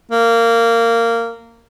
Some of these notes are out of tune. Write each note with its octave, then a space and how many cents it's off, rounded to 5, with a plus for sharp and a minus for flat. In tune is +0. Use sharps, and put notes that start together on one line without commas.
A#3 -15